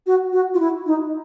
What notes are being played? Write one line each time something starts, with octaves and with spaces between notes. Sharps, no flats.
F#4
F#4
F4
E4
D#4